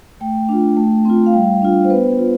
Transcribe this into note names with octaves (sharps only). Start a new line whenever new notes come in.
A3 G5
D4 F4
A3
C4 F4
F5
G3 G5
D4 F4
C5
B3 B4
F4